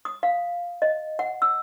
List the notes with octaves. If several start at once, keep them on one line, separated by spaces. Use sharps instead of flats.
D#6
F5
D#5
F#5
E6